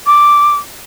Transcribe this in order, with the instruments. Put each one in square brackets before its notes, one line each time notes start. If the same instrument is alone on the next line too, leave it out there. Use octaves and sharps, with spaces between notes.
[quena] D6